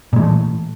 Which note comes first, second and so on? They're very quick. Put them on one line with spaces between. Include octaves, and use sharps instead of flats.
A#2 G#3 E3 A3